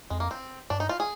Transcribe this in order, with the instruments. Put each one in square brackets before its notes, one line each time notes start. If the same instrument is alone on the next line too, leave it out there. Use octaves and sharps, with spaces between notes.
[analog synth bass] F2 [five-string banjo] G#3
[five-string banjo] A#3
C4
[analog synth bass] G2 [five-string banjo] D4
[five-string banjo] D#4
F4
G#4